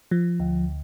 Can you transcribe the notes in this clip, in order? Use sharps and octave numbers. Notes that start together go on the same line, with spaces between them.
F3
D2